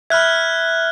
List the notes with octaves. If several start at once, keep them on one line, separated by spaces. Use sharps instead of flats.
E5 B5 F6 F#6 G#6